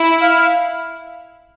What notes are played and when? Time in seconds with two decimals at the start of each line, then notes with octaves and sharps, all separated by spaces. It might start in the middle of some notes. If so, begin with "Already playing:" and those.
Already playing: E4
0.21 F5